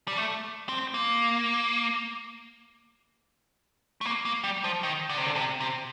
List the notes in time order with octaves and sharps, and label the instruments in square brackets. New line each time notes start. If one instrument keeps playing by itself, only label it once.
[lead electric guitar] G3
A3
C4
A#3
A3
A#3
A#3
G3
F3
D#3
D3
C3
D3
C3
C3